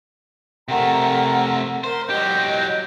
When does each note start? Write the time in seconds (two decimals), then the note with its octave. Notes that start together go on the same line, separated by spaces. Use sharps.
0.68 C3 A3 A#4 F#5 A#5
1.84 A#4 C5 E5
2.10 F#3 G4 D#5 G6